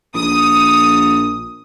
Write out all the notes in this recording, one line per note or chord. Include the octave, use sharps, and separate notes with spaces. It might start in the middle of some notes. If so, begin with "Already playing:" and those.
A#1 D#6